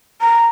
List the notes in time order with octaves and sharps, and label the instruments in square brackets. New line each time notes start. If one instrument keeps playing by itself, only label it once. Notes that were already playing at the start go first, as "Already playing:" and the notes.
[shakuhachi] A#5